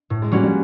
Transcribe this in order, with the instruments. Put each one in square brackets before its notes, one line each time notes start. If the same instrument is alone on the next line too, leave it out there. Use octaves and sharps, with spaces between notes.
[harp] A2
[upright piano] G#3
[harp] F#3 A#3 C#4 F#4 [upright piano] G3
[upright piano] G3